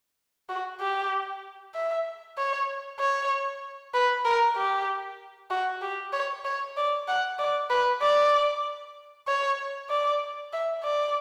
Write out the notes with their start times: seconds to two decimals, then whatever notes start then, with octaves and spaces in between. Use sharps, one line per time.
0.49 F#4
0.80 G4
1.75 E5
2.37 C#5
2.99 C#5
3.94 B4
4.25 A#4
4.56 G4
5.51 F#4
5.82 G4
6.13 C#5
6.45 C#5
6.77 D5
7.08 F#5
7.38 D5
7.70 B4
8.02 D5
9.28 C#5
9.90 D5
10.53 E5
10.83 D5